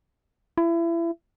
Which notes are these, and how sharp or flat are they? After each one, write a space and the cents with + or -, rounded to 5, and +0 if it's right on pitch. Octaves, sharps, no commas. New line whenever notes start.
E4 +30